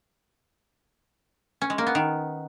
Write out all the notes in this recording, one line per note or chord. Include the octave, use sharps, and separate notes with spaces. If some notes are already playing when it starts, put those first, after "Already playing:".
C#4
G#3
A#3
B3
D#3